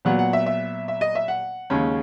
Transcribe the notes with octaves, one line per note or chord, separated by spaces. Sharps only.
A#2 F#3 B3 F#5
F#5
E5
E5
E5
D#5
E5
F#5
D#2 C#3 G#3 C#4